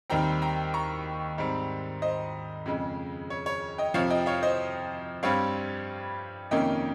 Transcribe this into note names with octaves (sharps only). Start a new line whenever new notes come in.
D#2 D#3 G3 C4 G5 A#5
G5 A#5
A#5 C#6
G#2 G3 C4
C5 D#5
F2 C#3 G#3
C#5
C#5
D#5 G5
F2 C3 F3 C#5 F5
D#5 G5
C#5 F5
C5 D#5
G2 G3 C4 C#5 F5
F2 C3 D#3 A#3 C#4 D#5 G5